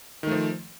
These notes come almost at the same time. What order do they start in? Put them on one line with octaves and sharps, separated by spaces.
D#3 A3 F3